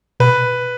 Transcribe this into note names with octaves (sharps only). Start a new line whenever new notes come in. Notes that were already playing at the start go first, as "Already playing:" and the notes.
B2 B4